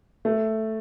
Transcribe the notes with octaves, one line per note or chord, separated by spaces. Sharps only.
A3